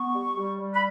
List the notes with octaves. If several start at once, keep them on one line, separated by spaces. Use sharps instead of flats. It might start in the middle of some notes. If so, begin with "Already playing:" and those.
Already playing: B3 C#6
G3
G3
G3
B5